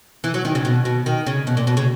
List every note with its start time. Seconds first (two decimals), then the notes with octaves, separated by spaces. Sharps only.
0.24 E3
0.34 F#3
0.45 D#3
0.55 C#3
0.65 B2
0.85 B2
1.06 D#3
1.26 C#3
1.47 B2
1.57 A#2
1.67 B2
1.77 C#3